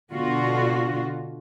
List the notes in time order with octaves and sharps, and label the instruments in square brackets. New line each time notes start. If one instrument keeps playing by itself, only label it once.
[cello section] B2 D3 F4 F#4